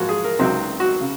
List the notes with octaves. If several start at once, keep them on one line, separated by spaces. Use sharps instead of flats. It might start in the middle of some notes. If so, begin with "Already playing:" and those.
Already playing: G#2 F3 A#3 F#4
G#4
A#4
C#2 C3 F#3 C4 D#4
F#4
C#3